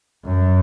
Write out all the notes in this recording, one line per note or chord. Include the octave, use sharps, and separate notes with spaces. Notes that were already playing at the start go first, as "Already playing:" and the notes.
F#2